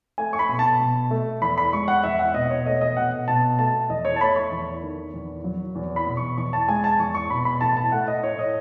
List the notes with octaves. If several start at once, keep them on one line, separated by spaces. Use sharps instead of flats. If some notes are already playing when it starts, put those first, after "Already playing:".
A3 G#5
C#6
B5
B2
A5
B2
A3
E2 B5
B5
G#3 C#6
F#5
E2 E5
F#5
B2 D#5
C#5
A3 D#5
D#5
B2 F#5
B2 A5
A3 A5
E2 D#5
C#5
A5
A3 B5
C#6
E2
D#3
E2
F#3
E2
B5
B2
C#6
E2 C#6
A5
G#3 G#5
A5
E2 C#6
C#6
B2 B5
B5
A2 A5
A5
A3 F#5
D#5
A2 C#5
D#5